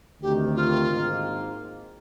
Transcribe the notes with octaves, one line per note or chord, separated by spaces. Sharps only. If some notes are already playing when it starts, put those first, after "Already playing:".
D2 C3 D#3 G4
F4
G#1 G#2 D#3 A#3